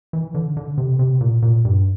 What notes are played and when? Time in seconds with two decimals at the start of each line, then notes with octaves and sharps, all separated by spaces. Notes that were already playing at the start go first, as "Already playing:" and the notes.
0.13 E3
0.35 D3
0.57 D3
0.78 C3
0.99 C3
1.21 A#2
1.42 A#2
1.65 G2